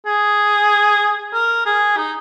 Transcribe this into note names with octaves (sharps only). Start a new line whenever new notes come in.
G#4
A#4
G#4
D#4